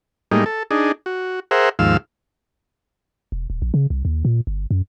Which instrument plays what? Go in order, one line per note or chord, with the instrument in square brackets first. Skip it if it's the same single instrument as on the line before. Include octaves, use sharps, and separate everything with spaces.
[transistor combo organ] A2 G3 G#3 A#3 D#4
A4
D4 D#4 G#4
F#4
G#4 A#4 C5 E5 F#5
D#2 G#2 F3 F5 E6
[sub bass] E1
D#1
A#1
C#3
C2
D#2
A#2
G1
F#2